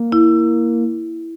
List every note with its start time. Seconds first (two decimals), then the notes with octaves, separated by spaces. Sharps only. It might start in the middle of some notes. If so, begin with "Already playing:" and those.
Already playing: A#3
0.12 E4